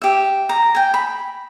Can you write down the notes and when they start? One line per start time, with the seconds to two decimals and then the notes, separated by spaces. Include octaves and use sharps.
0.02 G4 E5
0.49 A#5
0.75 G5 G#5
0.94 B5